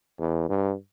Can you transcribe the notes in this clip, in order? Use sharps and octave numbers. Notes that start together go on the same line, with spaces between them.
E2
G2